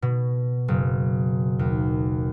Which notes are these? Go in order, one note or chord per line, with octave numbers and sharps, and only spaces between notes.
B2
F#1
D#2